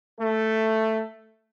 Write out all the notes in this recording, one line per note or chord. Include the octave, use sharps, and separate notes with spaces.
A3